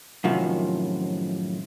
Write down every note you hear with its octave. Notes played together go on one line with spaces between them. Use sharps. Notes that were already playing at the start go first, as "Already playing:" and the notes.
F#2 A2 C3 D#3 F3